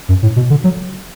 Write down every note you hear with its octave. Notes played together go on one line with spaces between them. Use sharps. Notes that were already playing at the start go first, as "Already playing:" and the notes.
F#2
A2
B2
D3
F#3